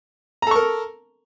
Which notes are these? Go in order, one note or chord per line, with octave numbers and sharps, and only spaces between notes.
A4 A#4 A#5 C#6